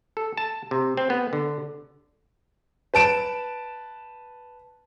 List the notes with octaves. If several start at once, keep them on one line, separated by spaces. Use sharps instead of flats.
A4
A5
C3
C4
B3
D3
B4 A5 D7 E7